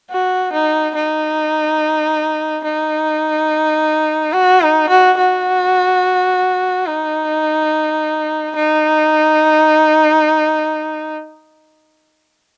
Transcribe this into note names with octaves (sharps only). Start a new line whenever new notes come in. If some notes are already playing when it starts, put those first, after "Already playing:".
F#4
D#4
D#4
D#4
F#4
D#4
F#4
F#4
D#4
D#4